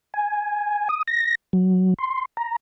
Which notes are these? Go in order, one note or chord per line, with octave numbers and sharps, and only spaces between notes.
G#5
D#6
A#6
F#3
C6
A#5